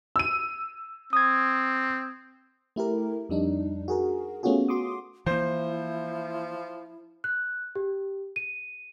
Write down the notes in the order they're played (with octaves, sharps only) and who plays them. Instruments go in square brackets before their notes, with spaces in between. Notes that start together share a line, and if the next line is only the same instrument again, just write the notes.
[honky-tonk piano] E6 D#7
[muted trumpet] C4 [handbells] D#6 G#6
[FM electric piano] A3 E4 G4 A#4
F2 G3 D4 D#4
F#4 G#4 A#4
A3 B3 C#4 F4 F#4 G#4
F#4 C6 D6 D#6
[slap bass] E3 A#3 [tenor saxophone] F3 [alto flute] E4 [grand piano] C5
[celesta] F#6
G4
D#7